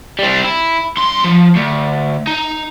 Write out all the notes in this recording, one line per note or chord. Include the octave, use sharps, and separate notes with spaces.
G3 C4
E4
G2 C6
F3
D2
D#4